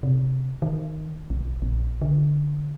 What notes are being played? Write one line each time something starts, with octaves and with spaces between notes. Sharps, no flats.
C3
D#3
B1
A#1
D3